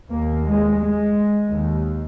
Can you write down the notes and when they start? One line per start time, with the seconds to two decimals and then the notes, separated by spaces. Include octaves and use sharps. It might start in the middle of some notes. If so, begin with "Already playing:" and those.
0.11 D#2 A#3
0.46 G#3
0.80 G#3
1.50 D#2